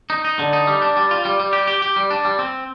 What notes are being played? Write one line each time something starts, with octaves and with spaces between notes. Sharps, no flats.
D#4
D#4
D3
D#4
G3
D4
G3
F4
G3
G3
G4
G4
G4
G3
D4
G3
C4